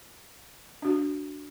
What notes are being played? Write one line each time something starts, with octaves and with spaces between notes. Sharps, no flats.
D4 F#4